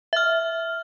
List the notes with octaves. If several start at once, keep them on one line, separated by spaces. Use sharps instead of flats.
E5 F6